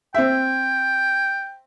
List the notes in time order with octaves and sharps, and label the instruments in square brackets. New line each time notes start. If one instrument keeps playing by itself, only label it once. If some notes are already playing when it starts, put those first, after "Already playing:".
[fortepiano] C4 E5 [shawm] G5